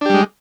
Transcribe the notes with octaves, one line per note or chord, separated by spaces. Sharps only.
G3 G#3 D4 G4